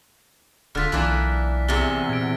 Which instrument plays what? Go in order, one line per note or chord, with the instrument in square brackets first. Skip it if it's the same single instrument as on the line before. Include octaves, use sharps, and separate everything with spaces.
[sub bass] D#1 [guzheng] D3 F4 [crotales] F6 A6 B6
[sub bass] B1 [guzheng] E3 A#3 D4
[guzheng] E2 C3 [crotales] A6 A#6 G7
[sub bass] A#2 [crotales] G#6 D7